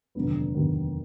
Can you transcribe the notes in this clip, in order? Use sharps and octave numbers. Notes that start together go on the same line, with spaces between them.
F1 D#2 D3 F#3 B3
F1 D#2 D3 F#3 B3